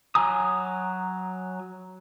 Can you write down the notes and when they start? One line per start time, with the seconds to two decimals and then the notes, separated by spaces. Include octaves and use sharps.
0.15 F#3 G#5 A#5 D#6